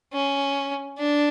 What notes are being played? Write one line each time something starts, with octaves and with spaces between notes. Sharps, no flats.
C#4
D4